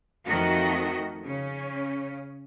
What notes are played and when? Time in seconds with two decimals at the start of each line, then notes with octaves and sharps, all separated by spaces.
0.24 F2 D#3 A3 F#4 D#5
1.24 C#3 C#4